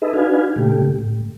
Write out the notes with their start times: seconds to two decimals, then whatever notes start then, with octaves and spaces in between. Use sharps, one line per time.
0.02 D#4 G#4 A4 B4 D#5 E5
0.13 D4 D#4 F#4 B4 F5 G#5
0.56 A#2 C#3 A3 G4
0.99 A2